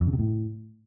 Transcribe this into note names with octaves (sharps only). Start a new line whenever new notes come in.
F2
C#3
C3
A2